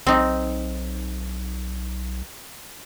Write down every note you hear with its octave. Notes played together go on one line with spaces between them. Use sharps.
B1 C4 D#4